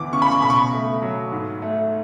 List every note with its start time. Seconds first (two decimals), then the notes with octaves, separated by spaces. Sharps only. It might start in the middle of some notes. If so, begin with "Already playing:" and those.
Already playing: D2 E3 D6
0.13 C#3 C#6
0.22 B5
0.31 C#6
0.42 B2 B5
0.50 C#6
0.57 B5
0.73 A3
1.02 F#3
1.32 G#2
1.62 A3